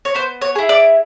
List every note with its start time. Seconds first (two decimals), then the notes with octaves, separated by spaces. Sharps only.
0.05 C#5
0.15 B3 C5
0.41 C#5
0.55 E4 G#4
0.69 D5